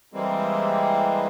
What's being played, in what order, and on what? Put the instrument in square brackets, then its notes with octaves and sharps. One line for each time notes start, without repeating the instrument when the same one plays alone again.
[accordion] E3 G3 G#3 A#3 C4